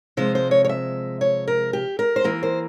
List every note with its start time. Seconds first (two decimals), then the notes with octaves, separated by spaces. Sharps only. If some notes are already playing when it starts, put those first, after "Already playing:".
0.17 C3 F3 G#3 C5
0.35 C5
0.51 C#5
0.65 C#5
0.69 E5
1.21 C#5
1.48 A#4
1.73 G4
1.99 A#4
2.16 C5
2.24 E3 A#3 A#4
2.43 C5